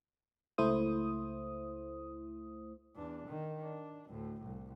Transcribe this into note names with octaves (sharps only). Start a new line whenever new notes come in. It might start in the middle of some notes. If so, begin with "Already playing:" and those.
C#2 A3 E4 C5 D#6
E2 D4
D#3
D4
D2 A2
C2